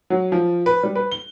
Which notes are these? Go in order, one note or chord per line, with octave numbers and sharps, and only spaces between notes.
F#3
F3
B4
G3
B4
G7